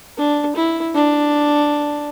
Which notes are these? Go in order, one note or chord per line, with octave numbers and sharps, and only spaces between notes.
D4
E4
D4